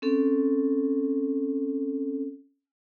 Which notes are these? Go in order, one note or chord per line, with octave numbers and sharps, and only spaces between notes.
C4 C#4 A4